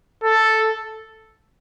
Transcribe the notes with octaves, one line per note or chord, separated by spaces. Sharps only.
A4